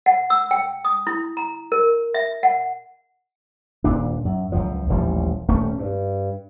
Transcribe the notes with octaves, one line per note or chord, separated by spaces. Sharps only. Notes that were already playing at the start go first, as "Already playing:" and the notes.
F#5
E6
G5
D#6
E4
A#5
A#4
E5
F#5
D#1 A#2 D4
F#2
C#2 F#2 F3
D#1 A1 F3 G3
D#1 A3 C#4
G2